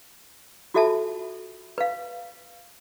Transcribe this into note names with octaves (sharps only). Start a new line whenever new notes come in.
F4 F#4 A4 E5 G#5 A5
B4 F5